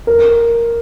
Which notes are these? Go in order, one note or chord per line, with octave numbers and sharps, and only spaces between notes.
A#4